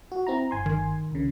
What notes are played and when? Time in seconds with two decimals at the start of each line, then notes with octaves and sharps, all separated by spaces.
0.12 F#4
0.27 C4 E4 A#5
0.51 G1 G#5 C6
0.66 D#3
1.11 C2 C#3